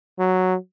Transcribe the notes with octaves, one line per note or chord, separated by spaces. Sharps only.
F#3